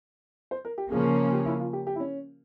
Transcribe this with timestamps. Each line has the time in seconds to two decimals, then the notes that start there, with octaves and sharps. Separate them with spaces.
0.51 C5
0.65 A#4
0.78 G4
0.91 C#3 F3 A#3 C#4 G#4
1.33 G4
1.46 E4
1.60 F4
1.73 G4
1.87 G4
1.96 E4
2.00 C#4